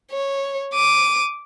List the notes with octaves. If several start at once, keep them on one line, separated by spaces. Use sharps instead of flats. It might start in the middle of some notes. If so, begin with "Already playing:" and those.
C#5
D6 D#7